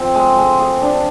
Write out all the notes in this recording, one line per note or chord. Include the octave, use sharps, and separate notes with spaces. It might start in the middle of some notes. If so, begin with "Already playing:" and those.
Already playing: F3 C4
G#3
G#3
G#4
D4